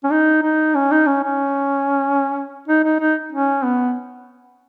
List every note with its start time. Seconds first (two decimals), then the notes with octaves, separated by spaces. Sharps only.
0.04 C#4
0.11 D#4
0.43 D#4
0.75 C#4
0.91 D#4
1.07 C#4
1.23 C#4
2.68 D#4
2.84 D#4
3.00 D#4
3.33 C#4
3.64 B3